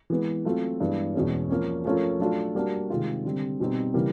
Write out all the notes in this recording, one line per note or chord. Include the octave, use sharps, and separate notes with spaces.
E3 G#3 B3
F#3 A3 C4 F4
G2 E3 G#3 B3
E2 B2 G#3 C#4
F3 A#3 C#4
F3 A3 C#4 F4 A#4
F#3 A3 D4 F4
G3 A#3 D4 F#4
C3 D#3 G#3 C4 F4
D3 G3 C4
B2 G3 C4 D#4
C#3 E3 G3 A#3